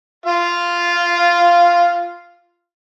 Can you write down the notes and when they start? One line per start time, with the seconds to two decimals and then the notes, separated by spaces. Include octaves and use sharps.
0.26 F4 F5